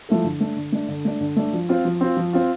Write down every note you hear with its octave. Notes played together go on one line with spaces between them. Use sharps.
F3 A3 E4 A4
D3
A3 D4
D3
A3 D4
D3
A3 D4
D3
A3 D4
F3
C4 F4
F3
C4 F4
F3
C4 F4